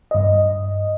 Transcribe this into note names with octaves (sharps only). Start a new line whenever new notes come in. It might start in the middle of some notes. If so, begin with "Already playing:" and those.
G2 D#5